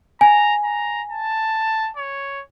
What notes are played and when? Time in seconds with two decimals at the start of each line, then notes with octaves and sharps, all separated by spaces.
0.21 G#5 A#5
0.64 A#5
1.10 A5
1.97 C#5